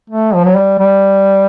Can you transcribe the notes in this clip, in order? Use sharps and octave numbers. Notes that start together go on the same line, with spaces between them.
A3
F3
F#3
G3
G3